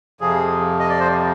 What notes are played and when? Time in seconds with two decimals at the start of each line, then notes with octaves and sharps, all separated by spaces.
0.21 F2 C3 F3 G#4
0.79 D#5
0.89 D5
1.00 C5